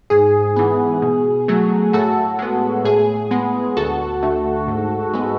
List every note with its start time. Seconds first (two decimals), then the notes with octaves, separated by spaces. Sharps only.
0.10 G#2 G#4
0.56 E3 B3
1.02 B2
1.48 F#3 A3
1.93 A2 F#4 A4
2.39 G#3 B3
2.85 A2 G#4
3.31 G#3 B3
3.77 D2 F#4 A4
4.23 D3 A3
4.68 G#2
5.13 G#3 B3